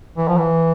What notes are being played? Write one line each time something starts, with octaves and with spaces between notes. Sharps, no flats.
E3
F3
E3